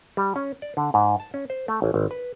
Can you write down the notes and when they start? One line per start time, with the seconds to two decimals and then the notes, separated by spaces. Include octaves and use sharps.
0.17 G3
0.36 C#4
0.62 D5
0.77 D3
0.94 G#2
1.20 A5
1.34 C#4
1.50 C5
1.68 A3
1.82 A1
1.94 G#1
2.11 B4